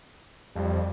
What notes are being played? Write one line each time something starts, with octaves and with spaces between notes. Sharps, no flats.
F2 G3